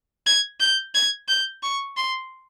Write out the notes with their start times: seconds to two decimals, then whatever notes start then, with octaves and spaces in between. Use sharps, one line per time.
0.26 G#6
0.60 G6
0.94 G#6
1.28 G6
1.63 C#6
1.97 C6